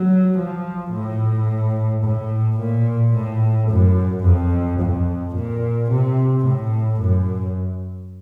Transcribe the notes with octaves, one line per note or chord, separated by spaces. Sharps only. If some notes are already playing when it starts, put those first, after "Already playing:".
Already playing: F#3
F3
A2
A2
A#2
A2
F#2
F2
F2
A#2
C3
A2
F#2